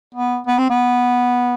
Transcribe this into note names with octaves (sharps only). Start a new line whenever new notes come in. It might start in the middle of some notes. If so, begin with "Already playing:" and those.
B3
B3
C4
B3